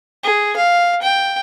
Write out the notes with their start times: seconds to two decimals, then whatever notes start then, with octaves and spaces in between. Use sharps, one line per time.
0.23 G#4
0.56 F5
1.02 G5